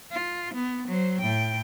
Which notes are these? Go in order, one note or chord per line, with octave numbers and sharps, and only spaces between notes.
F4
B3
F#3 C5
A2 G5